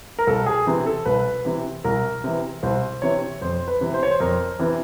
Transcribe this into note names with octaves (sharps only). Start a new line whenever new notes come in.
A#4
C2 A4
G#4
C3 E3
A4
C2 B4
C3 E3
C2 A#4
C3 E3
C2 C5
C3 E3 C#5
F2 C5
B4
C3 E3
C5
C#5
C5
F2 A#4
C3 E3